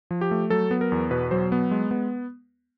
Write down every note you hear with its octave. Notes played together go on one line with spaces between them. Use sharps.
F3
G4
A3
F#3 A4
B3
A#4
E2
B2 B4
F#3 C5
B3
G#3
B3